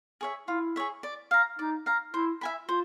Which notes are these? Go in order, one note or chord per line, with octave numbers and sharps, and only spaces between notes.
G#4 C#5 E5
E4 F4
G#4 C#5 E5
D5
F5 A#5
D#4 D5
F5 A#5
E4 C5
E5 G#5 B5
F4 C5